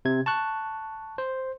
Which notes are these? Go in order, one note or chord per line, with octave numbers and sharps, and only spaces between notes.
C3 G#6
A5 C#6 F#6
C5